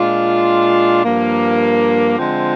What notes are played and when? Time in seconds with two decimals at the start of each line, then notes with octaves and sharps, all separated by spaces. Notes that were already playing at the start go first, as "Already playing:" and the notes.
Already playing: A#2 G#3 D4 F4
1.03 G2 F3 A#3
2.17 D3 F3 G#3 C4 F4